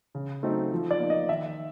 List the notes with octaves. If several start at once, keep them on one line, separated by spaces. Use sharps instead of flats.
C#3
F#3 A3 C4 D#4
F3
D5
A#3 D#4
D#5
D#3 E5